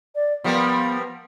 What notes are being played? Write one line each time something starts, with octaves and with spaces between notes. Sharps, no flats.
D5
F3 G3 A#3 B3